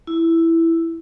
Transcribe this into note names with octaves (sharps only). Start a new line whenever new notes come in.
E4